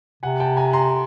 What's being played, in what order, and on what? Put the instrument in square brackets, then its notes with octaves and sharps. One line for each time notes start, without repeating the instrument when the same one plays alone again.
[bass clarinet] C3 [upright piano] F#5 G#5
[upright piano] G5 A5
G#5 A#5
A#5 C6